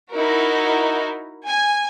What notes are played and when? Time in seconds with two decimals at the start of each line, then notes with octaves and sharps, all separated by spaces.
0.14 D#4 E4 F#4 A#4
1.46 G#5